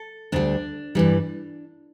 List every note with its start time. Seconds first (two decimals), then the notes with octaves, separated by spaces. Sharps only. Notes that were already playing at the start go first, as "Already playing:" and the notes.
Already playing: A4
0.32 D2 D3 G3 D4
0.95 G2 E3 G3